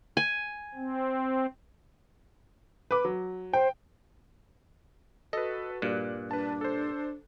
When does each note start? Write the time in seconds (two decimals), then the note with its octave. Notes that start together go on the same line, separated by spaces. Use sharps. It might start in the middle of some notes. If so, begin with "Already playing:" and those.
0.17 G#5
0.75 C4
2.91 B4 D6
3.05 F#3
3.53 C5 G5
5.33 F#4 A4 B4 D#5
5.82 G2 A#2 D5 F#6
6.31 D4 B4 A5
6.61 A4 C5